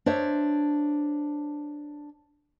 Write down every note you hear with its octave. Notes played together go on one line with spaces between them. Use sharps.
D4 C5 C#5 E5